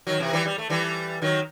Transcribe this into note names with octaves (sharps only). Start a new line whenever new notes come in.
D#3 F#3
C3 E3
E3 G3
G3
A3
E3 G3
D#3 F#3